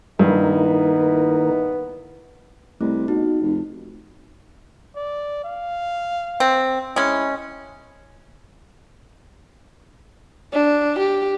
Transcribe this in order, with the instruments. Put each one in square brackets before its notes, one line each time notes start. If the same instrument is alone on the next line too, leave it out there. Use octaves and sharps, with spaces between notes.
[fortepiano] G2 [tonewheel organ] D#3 A#3 A#4 [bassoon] B3 [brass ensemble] D#4 E4
[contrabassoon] C2 [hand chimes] A3
[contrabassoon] B2 [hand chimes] D#4
[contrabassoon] F1
[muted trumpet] D5
F5
[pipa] C4
[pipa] G#3 C#4 [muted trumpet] E4
[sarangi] D4
G4